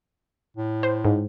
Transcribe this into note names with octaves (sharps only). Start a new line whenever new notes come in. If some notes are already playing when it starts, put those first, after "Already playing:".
A2
C5
G#2